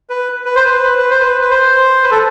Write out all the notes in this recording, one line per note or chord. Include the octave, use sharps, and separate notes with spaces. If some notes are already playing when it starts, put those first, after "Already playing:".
B4
B4
C5
B4
B4
C5
B4
B4
C5
B4
A4